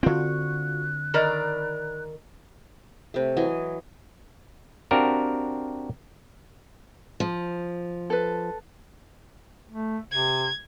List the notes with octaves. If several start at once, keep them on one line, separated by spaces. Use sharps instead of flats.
D3 C4 F4 F#4 C#6 F#6
D#3 A#4 D5 B5
C3 A3
E3 F#3 D#5 G#5
C4 D4 F#4 G4 A#4 F5
F3
A4 B4
A3
C3 G#6